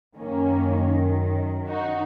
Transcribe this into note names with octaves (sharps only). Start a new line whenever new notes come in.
F#2 D#3 A#3 C#4
D#4 F#4